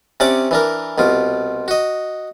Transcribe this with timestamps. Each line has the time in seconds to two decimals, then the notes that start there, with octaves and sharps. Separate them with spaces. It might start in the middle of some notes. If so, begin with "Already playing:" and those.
0.20 C3 C#4 D5 F#5 D6
0.51 E3 D4 A#4
0.98 C2 B2 F4
1.68 F#4 D#5